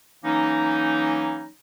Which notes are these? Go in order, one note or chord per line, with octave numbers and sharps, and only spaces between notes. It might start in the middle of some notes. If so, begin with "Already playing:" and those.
E3 F#3 A#3 C#4 D#4